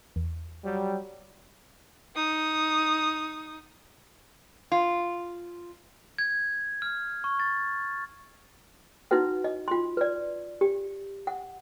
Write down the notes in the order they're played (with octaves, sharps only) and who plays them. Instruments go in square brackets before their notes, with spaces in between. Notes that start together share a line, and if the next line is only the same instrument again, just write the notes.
[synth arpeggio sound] E2
[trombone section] F#3 G3
[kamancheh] D#4 D#6
[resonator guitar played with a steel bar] F4
[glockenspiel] G#6
F6
C#6
A6
[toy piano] D#4 E4 F#4 B4 F#5
D#5
F4 C6
B4 D5
G4
F#5